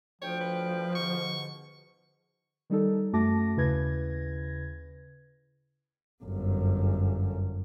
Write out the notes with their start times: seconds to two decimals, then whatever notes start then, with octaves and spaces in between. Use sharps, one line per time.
0.22 D2 F3 C#5 G5
0.41 B4
0.95 G#2 B2 D3 C#6
2.70 D#3 G3 D#4 A4
3.13 F#2 A3 F#4 A5 D6 A#6
3.56 D#2 C#3 E4 B4 G#6 A#6
6.24 G1 F#2